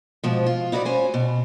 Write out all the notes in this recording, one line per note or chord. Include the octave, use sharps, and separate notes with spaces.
G#2 B2 F3
F4
D#4 E4 F#4 B4 D5
C#4 C5 G#5
B2